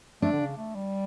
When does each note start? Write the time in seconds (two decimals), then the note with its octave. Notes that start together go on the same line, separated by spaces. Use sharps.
0.22 A3 D4
0.32 D3
0.40 C#3
0.57 A3
0.75 G3